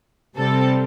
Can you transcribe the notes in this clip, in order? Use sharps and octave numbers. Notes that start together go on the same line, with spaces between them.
C3 G3 C4 A4